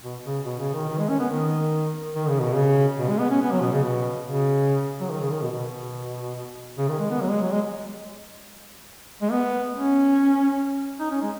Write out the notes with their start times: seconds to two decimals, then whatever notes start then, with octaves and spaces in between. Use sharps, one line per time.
0.03 B2
0.25 C#3
0.45 B2
0.59 C#3
0.74 D#3
0.88 D#3
0.99 G#3
1.09 C#4
1.19 B3
1.30 D#3
2.14 D#3
2.28 C#3
2.41 B2
2.55 C#3
2.99 B2
3.10 G#3
3.19 B3
3.30 C#4
3.41 B3
3.52 F#3
3.61 B2
3.72 C#3
3.83 B2
4.25 C#3
5.00 F#3
5.10 D#3
5.21 C#3
5.31 D#3
5.42 B2
5.52 B2
6.78 C#3
6.88 D#3
6.99 G#3
7.10 B3
7.21 F#3
7.31 G#3
7.42 F#3
7.52 G#3
9.22 G#3
9.31 B3
9.73 C#4
11.00 D#4
11.11 C#4
11.22 G#3